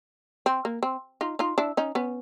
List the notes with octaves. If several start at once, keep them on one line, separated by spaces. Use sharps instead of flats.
C4
A#3
C4
D#4 F4
D#4 F4
D4 E4
C#4 D#4
B3 C#4